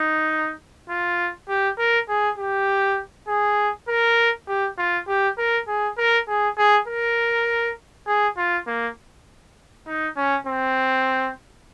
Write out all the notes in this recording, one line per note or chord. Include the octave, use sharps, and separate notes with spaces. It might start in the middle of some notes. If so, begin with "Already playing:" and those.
Already playing: D#4
F4
G4
A#4
G#4
G4
G#4
A#4
G4
F4
G4
A#4
G#4
A#4
G#4
G#4
A#4
G#4
F4
A#3
D#4
C#4
C4